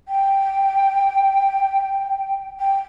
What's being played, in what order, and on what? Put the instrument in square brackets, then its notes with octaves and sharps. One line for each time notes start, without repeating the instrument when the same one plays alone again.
[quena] G5
G5